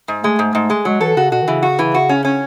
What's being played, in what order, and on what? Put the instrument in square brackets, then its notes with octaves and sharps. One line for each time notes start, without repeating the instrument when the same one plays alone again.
[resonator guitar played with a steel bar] G#2
[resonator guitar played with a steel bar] G#3 [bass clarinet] A3
[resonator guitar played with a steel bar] G#2
G#2
G#3
[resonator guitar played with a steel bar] F#3 [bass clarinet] G#3
[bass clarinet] E3 [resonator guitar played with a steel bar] A4
[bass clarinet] C#3 [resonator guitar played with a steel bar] F#4
[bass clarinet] B2 [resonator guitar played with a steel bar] F#4
[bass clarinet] D#3
[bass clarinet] C#3 [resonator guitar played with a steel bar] E3
[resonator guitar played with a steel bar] F#4
E3
F#4
C#4
C#4